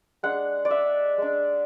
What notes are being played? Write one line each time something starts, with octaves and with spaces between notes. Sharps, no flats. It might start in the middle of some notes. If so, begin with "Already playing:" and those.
G#3 D4 F#5
D5
E5
G#3 D4